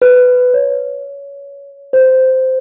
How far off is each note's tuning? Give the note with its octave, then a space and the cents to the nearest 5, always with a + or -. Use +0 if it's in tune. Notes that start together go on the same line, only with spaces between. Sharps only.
B4 +15
C#5 +20
C5 -10